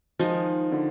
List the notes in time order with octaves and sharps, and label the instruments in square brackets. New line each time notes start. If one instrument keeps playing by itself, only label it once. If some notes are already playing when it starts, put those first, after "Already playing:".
[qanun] D#3 G#3 D#4 A#4 [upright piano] F3
[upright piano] D3